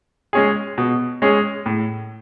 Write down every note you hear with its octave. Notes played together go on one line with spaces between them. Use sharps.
G#3 C#4 G#4
B2
G#3 C#4 G#4
A2